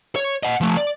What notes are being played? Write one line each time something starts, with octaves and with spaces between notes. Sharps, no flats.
C#5
D#5 F#5
F3 A3
D5